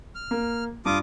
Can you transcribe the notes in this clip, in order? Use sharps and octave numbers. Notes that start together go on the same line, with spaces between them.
F6
A#3
G2 F4 D6 D#6